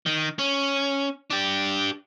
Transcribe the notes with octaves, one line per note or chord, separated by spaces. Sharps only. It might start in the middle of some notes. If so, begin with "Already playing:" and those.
D#3
C#4
D4 G4